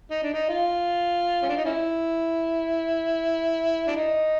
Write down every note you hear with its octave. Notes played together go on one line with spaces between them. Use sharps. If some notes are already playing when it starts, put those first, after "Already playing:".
D#4
D4
D#4
F4
C#4
D4
D#4
C#4 E4
D4
D#4